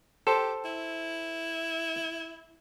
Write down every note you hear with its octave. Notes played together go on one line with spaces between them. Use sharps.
G4 A4 C5
E4